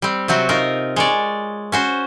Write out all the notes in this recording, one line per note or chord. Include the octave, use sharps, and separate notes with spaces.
G3 C4
C3 F#3 C4 F#4
D#4 F4 A#4
G#3 C#5 D5
C#4 F#4 C5